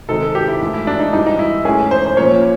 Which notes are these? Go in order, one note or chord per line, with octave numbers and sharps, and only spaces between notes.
C3 D#3 G#3 C4 A4
G4
E4
G#2 E3 A3
E4
D4
D#4
G#2 E3 G3 D#4
D#4
E4
G#2 E3 A3 C#4 G#4
C5
C5
A#2 F3 A#3 C#4 C#5